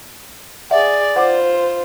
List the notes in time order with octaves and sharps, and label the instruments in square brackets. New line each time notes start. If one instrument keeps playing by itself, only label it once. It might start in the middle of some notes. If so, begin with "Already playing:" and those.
[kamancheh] G#4 [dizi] D5 [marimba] E5 F#5
[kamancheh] F4 C5 [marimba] F#5 D6